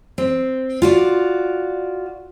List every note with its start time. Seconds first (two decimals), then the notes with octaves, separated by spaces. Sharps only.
0.18 C4
0.82 F4 F#4 D5